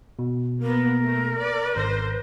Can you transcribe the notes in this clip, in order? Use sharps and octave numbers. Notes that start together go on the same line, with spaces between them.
B2
A#3 B3 A#4
A3
D5
G#1 C5 A#6